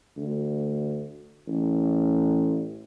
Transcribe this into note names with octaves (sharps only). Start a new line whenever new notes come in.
D2
A1